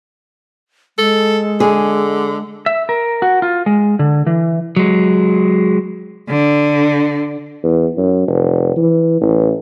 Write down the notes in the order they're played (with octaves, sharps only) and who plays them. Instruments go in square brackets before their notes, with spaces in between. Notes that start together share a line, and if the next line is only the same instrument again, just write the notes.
[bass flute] G#3 [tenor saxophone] A4
[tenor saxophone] D3 [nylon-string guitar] G#4
[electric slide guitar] E5
A#4
F#4
F4
G#3
D3
E3
[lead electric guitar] F#3 G#3
[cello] D3
[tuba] E2
F#2
F1
E3
A1